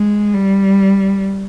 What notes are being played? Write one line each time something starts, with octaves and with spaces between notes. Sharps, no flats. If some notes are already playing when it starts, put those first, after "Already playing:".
Already playing: G#3
G3